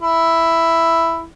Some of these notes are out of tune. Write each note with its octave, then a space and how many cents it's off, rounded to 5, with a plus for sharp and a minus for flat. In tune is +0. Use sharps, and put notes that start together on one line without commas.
E4 +5